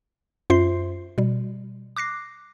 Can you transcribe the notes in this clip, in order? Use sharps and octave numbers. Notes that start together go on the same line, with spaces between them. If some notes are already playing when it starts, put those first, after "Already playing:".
F#2 F4 C5 E5 C6 C7
B2 G3
D6 F#6 A#6 C7